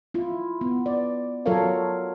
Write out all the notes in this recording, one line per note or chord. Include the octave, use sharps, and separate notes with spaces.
E4 F4
B3
D5
F#3 F4 A4 A#4 C#5 F5